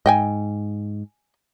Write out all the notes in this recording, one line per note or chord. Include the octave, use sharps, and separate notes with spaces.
G#2 D#5 G5 G#5